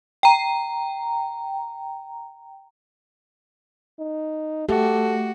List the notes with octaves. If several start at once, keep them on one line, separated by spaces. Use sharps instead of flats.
G5 A#5
D#4
A3 F#4 G4 A4